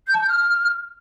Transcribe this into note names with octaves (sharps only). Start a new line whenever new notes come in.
G6
A5
G6
F6